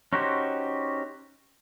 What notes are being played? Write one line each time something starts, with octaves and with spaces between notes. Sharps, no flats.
C#4 D#4 F#4 G4 C5